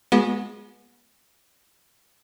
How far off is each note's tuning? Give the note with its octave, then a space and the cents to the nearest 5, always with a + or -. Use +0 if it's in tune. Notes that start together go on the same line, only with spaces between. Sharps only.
G#3 +0 B3 -30 F#4 -30